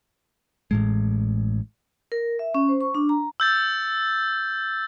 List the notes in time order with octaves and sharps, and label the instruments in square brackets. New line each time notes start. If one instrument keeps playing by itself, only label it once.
[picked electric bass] A1 A2 G#3
[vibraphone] A#4
E5
C#4
C5
C#6
D4
A#5
[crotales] E6 G6 A6